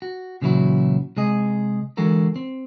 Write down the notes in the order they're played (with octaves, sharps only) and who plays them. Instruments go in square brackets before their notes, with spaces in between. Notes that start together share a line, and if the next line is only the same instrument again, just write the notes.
[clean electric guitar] F#4
A#2 C#3 E3 F#3 E4 F#4
C3 G#3 G#4 D#5
D3 E3 G#3 F#4 A4 A#4
C4